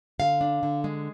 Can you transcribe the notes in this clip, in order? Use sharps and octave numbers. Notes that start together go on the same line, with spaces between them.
D3 F5
D4
D3
G#3